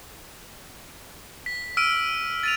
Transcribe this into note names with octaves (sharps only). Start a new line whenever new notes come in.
B6
E6 F6 D7 D#7
A6 D#7 F7